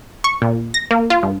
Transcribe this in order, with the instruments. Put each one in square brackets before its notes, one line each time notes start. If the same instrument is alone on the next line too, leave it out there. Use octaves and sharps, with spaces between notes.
[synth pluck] C#6
A#2
A#6
A#3
F4
G2